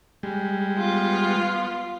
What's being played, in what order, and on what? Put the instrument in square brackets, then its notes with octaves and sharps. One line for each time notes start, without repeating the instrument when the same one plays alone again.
[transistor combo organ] G3 G#3
[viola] B3 F4